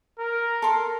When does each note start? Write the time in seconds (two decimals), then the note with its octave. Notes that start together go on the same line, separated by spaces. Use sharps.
0.19 A#4
0.62 A4 C6